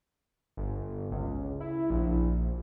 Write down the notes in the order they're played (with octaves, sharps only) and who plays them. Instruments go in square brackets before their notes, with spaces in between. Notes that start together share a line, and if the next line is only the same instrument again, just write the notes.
[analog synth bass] G1
C#2
E4
A#1